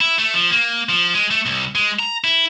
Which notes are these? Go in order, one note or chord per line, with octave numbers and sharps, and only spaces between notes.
E4
A3
F3
A#3
F3
G#3
A3
C2
G#3
A#5
E4